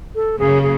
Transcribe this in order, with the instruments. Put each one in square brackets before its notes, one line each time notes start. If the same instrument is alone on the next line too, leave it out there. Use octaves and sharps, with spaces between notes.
[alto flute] A4
[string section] F#2 C#3 F#3 A#3 C#4 [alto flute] G#4
[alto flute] G#4